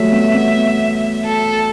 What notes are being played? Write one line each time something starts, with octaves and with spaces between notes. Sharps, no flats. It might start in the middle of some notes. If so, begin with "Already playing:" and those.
Already playing: F#3 G3 A3 E5
B3
B3
A4